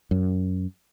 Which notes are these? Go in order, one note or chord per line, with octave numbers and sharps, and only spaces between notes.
F#2